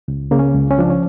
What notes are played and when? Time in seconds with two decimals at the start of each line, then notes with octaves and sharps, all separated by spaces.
0.08 C#2
0.31 C#3 A#3
0.39 C#4
0.55 C#2
0.71 C#4
0.79 F3 D4
0.90 C#4